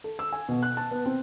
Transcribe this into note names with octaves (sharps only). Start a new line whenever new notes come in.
A4
E6
G#5
B2
F#6
A5
B3
C4